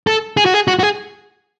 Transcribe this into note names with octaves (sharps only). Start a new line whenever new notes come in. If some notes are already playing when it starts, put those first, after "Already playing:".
A4
G#4
F#4
G#4
F#4
F#4
G#4